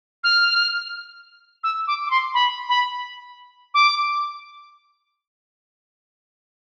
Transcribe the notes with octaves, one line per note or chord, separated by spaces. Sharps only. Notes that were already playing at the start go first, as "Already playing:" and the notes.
F6
E6
D6
D6
C6
B5
B5
D6